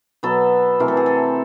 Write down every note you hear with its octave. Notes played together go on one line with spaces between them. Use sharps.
B2 F#3 B3 A4
C3 E3 A3 C4 A#4
A4
G#4
A4